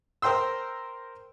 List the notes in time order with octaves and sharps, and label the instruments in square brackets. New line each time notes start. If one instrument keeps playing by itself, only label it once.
[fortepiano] A#4 C5 G5 C6 E6